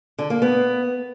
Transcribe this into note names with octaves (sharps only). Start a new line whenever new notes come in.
D3
A#3
B3